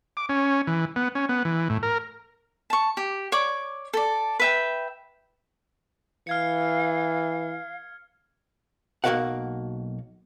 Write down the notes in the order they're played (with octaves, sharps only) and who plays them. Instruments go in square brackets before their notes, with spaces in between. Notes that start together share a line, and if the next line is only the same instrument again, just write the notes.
[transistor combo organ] D6
C#4
E3
B3
C#4
B3
E3
A2
A#4
[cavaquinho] A5 C#6
G4
C#5 D5 D6
A4 D5
B4 E5 G5
[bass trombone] E3 [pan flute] F5 [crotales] F6 G#6 C#7
[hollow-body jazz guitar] B1 A#3 F#4 A#4 F5 F#5